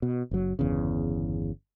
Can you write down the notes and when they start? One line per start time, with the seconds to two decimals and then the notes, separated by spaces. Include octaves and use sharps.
0.02 B2
0.31 F#1 F#3
0.59 G1 E2 C#3